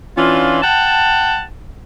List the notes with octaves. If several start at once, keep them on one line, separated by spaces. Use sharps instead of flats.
E3 C#4 D4 F4
F#5 G5 A5